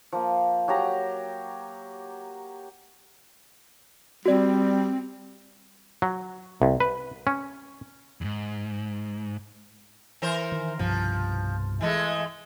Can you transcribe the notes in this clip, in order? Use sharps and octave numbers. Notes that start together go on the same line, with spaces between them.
F3 A#3
F#3 G4 A#5
G3 C4 F#4 D5
F#3
C2
B4
C#4
E2 G#2
E3 A#4 C5
D#3
C2 G2 B2 F3
E3 G#3 A3